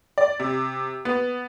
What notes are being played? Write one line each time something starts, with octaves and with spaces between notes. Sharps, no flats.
D5
C3
B3